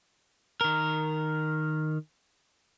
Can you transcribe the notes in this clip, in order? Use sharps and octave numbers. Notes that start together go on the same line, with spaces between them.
D#3 A#4